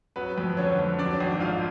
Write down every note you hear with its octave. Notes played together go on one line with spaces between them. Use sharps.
F#3 B3 B4
F2
D3 C#4 C#5
F2
F#3 D4 D5
G#1
G#2 F4 F5